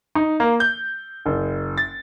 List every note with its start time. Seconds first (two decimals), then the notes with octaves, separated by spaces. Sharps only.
0.15 D#4
0.40 A#3
0.60 G6
1.26 F#1
1.78 A6